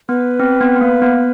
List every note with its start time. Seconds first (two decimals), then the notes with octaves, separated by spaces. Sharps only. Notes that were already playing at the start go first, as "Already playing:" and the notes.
0.09 B3 B4
0.40 C4
0.61 B3
0.76 B3
0.81 A#3
1.02 B3